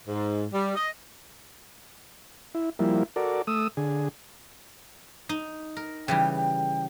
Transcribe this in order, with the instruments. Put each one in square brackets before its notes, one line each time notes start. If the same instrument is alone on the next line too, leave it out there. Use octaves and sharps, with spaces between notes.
[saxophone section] G#2
G3
D#5
[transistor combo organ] E4
F3 G3 A#3 E4
F#4 A4 A#4 D5
A3 D#6 E6
D3 G#4
[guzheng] D#4
A#4
[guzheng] C#3 E3 G3 [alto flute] G5
[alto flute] G5